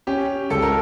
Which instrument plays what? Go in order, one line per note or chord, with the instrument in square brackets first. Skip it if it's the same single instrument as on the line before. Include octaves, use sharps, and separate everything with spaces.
[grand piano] C#4 [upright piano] G4
[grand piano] C#2 [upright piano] A4
[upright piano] A#4